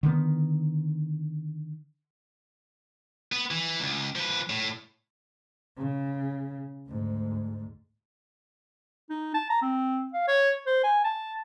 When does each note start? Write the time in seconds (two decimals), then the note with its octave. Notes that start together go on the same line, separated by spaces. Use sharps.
0.03 D3 D#3 G#3 B3
3.32 B3
3.51 E3
3.80 C#2
4.16 F3 B4
4.50 A2
5.77 C#3
6.88 D2 G#2
9.10 D#4
9.34 A5
9.50 A#5
9.62 C4
10.13 F5
10.28 C#5
10.66 C5
10.83 G#5
11.04 A5